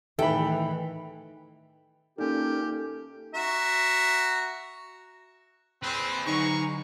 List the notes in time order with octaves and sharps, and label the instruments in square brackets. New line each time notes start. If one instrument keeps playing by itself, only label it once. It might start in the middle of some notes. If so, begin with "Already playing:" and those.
[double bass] A2 E3 [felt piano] D#3 E5 [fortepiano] A4 B5 [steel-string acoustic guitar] G5
[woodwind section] A#2 C#4 [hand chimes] A#3 D#4 [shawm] G4 [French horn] A4
[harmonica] F#4 E5 A#5
[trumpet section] C4 [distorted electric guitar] G#4 B4
[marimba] D3 F#3 [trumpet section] G#3 A#5 C#6 [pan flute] D#4